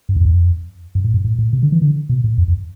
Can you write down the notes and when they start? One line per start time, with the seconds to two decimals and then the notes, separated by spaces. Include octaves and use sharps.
0.09 G2
0.16 F2
0.25 E2
0.33 F2
0.95 G2
1.04 A2
1.14 G2
1.24 A2
1.38 A2
1.53 C3
1.63 D3
1.72 E3
1.82 D3
2.09 B2
2.24 A2
2.38 F2
2.48 F2